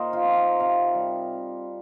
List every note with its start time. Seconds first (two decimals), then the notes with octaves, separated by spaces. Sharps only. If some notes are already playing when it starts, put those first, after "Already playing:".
Already playing: A#2 D#4 C5 D#5 F5 G5
0.13 F4
0.24 C4
0.37 A#4
0.60 C3 F5
0.95 G3